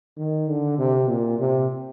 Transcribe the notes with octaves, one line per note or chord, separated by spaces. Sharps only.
D#3
D3
C3
A#2
C3